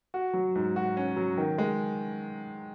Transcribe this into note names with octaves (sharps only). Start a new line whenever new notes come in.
F#4
F#3
G#2
F#4
C#4
F#3
D#3
G#3